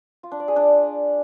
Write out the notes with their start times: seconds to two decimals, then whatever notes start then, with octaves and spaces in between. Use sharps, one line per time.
0.23 F4
0.32 D4
0.40 D5
0.48 G#4
0.56 D4